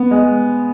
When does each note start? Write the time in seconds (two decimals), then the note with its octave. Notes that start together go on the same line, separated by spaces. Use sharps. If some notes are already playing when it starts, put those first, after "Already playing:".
Already playing: B3
0.11 G#3